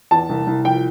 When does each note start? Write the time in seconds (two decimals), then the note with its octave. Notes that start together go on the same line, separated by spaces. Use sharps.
0.11 E2 A5
0.29 C2
0.47 C2
0.65 F3 G5